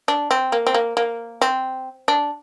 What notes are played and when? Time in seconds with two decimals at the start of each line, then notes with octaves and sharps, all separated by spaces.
0.08 D4
0.31 C4
0.52 A#3
0.67 C4
0.74 A#3
0.97 A#3
1.41 C4
2.08 D4